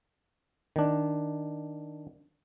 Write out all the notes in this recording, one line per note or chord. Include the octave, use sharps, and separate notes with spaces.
D#3 D4